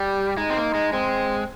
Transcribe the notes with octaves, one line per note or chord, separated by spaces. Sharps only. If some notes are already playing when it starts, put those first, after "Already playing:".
Already playing: G3 G4
G#3 D#4
C4
A#3
G#3
G#3 C4